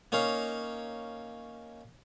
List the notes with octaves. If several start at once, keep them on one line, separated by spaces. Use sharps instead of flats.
A#3 C#4 D#4 C#5 F5